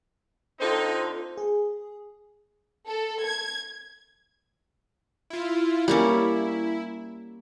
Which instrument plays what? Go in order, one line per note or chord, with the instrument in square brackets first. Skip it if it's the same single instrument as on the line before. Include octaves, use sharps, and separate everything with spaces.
[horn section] D3 C4 D#4 [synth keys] F4 A4 C5
[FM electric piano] G#4
[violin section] A4
G#6
[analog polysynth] E4 F4
[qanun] G3 A#3 C#4 [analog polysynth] E4